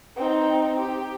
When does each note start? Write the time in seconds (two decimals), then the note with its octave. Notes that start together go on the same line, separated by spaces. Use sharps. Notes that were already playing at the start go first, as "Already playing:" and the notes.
0.16 C4 D#4
0.79 G4